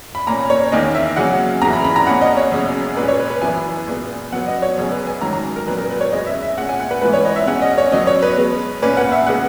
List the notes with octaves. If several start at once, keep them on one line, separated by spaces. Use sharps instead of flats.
B5
A#2 A#3 C#4 A#5
C#5
E2 D#3 A#3 C#4 D#5
E5
C#3 F#3 A#3 C#4 F#5
E2 C#3 E3 A#5
B5
B5
A#5
B2 A#3 C#4 F#5
D#5
C#5
F#2 C#3 G#3
A#2 G#3 C#4 B4
C#5
B4
B4
F#2 E3 B3 G#5
A#2 G#3 B3
B2 F#3 B3 F#5
D#5
C#5
F#2 C#3 G#3 C#4
B4
G#5
G#2 D#3 F#3 C#4 A#5
A#5
A#4
A#2 F#3 B3 B4
A#4
B4
C#5
E2 C#3 G#3 B3 D#5
E5
E5
A#2 G#3 C#4 F#5
G#5
F#5
B4
G#2 E3 B3 B4
C#5
D#5
E5
B2 G#3 C#4 F#5
D#5
C#5
B2 F#3 B3 D#5
C#5
B4
B2 G#3 B3
A#2 A#3 C#4 B4
F#5
E5
C#3 G#3 B3 F#5